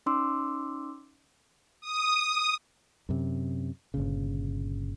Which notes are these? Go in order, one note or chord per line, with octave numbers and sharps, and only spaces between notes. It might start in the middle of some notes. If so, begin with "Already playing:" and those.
C#4 D#4 C6 D6 E6
D#6
F#2 C3
G1 C2 A#2 C#3